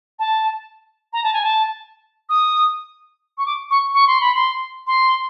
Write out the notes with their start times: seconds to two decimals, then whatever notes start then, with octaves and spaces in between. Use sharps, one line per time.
0.19 A5
1.13 A#5
1.23 A5
1.33 G#5
1.44 A5
2.29 D#6
3.38 C#6
3.46 D6
3.70 C#6
3.94 C#6
4.07 C6
4.21 B5
4.35 C6
4.87 C6